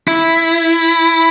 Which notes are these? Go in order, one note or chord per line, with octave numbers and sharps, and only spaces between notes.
E4